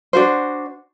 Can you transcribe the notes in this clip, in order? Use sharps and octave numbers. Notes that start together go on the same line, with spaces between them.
D4 F#4 C5